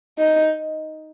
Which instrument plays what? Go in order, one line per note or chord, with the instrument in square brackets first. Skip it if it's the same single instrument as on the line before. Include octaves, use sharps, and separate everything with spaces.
[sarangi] D#4